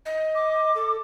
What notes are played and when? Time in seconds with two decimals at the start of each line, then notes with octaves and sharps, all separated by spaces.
0.06 D#5
0.35 D6
0.75 A4